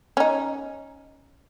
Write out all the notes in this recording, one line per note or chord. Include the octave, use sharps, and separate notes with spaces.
C#4 D#4